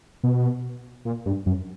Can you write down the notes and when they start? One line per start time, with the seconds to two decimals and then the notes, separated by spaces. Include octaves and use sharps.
0.23 B2
1.05 A#2
1.26 G2
1.46 F#2